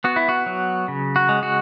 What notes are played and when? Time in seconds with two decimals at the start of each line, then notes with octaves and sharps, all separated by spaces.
0.04 B3 F#4
0.16 E4
0.29 F#4
0.46 F#3
0.88 C#3
1.16 F#4
1.29 G#3
1.43 F#4